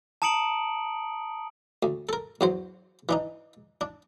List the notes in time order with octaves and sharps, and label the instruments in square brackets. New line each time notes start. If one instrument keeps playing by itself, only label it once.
[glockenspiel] A5 A#5 D#6 C#7 D7 F#7
[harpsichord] D2
A4 A#4
E2 F#3 C5
E3 D4 D#4
D4